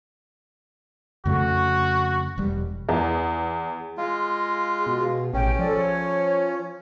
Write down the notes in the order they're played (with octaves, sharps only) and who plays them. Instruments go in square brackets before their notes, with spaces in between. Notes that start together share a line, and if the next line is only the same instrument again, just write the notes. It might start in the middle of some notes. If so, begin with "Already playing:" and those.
[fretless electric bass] F2 C#3 A3 [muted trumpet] F#4
[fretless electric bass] E1 G3
[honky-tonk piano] E2
[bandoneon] G#3 F4 [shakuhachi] G#4
[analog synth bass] B2
[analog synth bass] A1 [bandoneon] C#4 [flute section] G5
[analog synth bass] F3 [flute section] A4 D5
[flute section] C#5